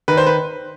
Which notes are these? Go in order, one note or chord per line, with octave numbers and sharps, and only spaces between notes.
D#3 B4
C5
B4